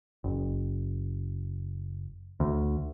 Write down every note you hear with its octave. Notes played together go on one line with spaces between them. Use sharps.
F#1
D2